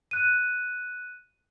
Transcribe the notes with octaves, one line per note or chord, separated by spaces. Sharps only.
F#6 D#7